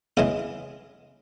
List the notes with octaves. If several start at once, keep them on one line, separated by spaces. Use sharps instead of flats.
C#3 E3 G#3 D#4